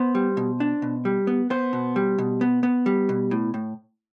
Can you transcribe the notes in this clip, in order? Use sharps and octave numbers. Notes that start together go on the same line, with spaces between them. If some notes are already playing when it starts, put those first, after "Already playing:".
Already playing: B3 C5
G3
B2
D4
B2
G3
B3
B3 C5
B2
G3
B2
B3
B3
G3
B2
A2
A2